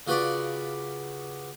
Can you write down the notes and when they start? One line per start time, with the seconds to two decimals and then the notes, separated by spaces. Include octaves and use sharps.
0.07 C#3 F4 F#4 B4 D5